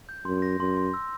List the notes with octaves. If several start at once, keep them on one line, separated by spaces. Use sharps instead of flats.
G6
F#2 C6
A#6
F#2 C6
C6
E6